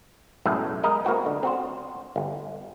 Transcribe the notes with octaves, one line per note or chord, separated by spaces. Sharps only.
B1 F#2 A2 G#3 A3
G#3 A#4 D#5
A3 A#3 C4 F4 F#4 B4
D3
C4 F#4 C5
G1